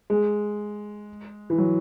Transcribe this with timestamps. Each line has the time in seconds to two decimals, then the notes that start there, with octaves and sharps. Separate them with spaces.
0.10 G#3
1.50 E3
1.58 F#3